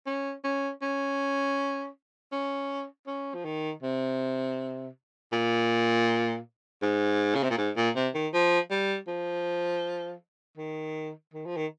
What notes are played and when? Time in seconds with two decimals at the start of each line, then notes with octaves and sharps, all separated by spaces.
0.06 C#4
0.44 C#4
0.82 C#4
2.32 C#4
3.07 C#4
3.34 F3
3.44 D#3
3.83 C3
5.32 A#2
6.82 G#2
7.35 C#3
7.43 C3
7.50 A#2
7.57 G#2
7.76 A#2
7.95 C3
8.14 D#3
8.33 F3
8.70 G3
9.07 F3
10.58 D#3
11.33 D#3
11.46 F3
11.56 D#3